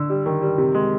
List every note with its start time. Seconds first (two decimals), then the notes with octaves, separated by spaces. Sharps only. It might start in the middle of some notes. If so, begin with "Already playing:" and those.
Already playing: D3 E6
0.10 G3
0.26 D#3
0.42 G3
0.58 C3
0.75 G#3